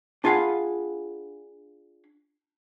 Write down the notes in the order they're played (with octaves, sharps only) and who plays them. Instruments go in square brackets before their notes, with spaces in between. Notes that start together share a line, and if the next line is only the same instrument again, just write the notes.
[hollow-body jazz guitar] D4 F4 G#4 F5 F#5 B5